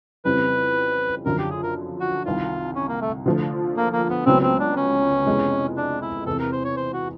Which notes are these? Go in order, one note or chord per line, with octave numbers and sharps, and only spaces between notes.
F2 C#3 E3 G3 C4 B4
F#2 D3 F3 A#4
G4
G#4
A#4
F#4
C2 C3 D#3 F4
C#4
A#3
A3
D3 F3 A3
A#3
A#3
B3
C#2 C#3 F#3 B3 C4
C4
D4
C#4
F2 C3 E3 G#3 B3
D4
E4
E2 C3 E3 A4
A#4
C5
C#5
C5
F#4